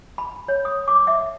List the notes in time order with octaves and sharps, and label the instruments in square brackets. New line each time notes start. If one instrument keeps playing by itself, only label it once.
[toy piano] B5
C#5
D#6
D6
E5